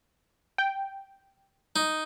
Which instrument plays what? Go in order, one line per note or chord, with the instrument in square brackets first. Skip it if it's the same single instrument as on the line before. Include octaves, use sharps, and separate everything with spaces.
[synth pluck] G5
[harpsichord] D#4